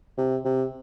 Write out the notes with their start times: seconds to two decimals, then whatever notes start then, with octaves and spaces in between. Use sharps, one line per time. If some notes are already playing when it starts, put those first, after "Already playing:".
0.18 C3
0.45 C3